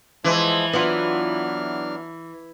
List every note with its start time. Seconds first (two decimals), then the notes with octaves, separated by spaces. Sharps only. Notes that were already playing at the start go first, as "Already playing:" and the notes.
0.24 E3 F3 G#3 C5
0.73 F#3 B3 D4 E4 F4 F6